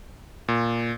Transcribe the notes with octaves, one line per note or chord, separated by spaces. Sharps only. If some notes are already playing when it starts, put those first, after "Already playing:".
A#2